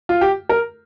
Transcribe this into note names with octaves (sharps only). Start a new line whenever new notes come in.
F4
G4
A#4